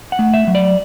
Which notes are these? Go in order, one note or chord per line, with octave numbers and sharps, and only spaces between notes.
F#5
A3
E5
F#3
D5